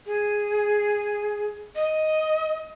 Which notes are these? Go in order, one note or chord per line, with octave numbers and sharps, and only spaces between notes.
G#4
D#5